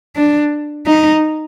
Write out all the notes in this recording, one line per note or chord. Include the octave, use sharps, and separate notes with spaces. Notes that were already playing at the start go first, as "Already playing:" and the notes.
D4
D#4